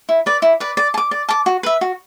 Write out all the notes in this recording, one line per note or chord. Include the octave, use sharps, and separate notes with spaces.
E4
B4 D5
E4
B4 D5
D5
A5
D6
D5
A5 D6
F#4
B4 E5
F#4